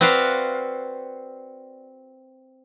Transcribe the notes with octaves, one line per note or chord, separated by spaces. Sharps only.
C4 F#4 B4 D5 F5